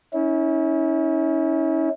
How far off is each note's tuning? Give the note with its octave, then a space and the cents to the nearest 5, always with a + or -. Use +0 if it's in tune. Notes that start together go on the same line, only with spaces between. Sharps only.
C#4 +10 E4 -40